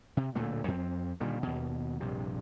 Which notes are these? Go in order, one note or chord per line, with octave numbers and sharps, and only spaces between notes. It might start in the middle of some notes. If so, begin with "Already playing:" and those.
C3
D1 A#2 D3 A3
F2 C4
A#2 D3 D#3 G3
D#2 B2
A#1 G2 C3